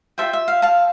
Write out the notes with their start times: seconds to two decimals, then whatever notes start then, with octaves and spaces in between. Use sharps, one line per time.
0.18 F4 A4 C5 E5 G5
0.33 E5
0.48 F5
0.62 F5 A5